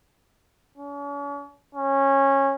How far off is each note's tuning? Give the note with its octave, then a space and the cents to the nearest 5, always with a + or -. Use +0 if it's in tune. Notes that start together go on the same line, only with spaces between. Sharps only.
C#4 +45
C#4 -20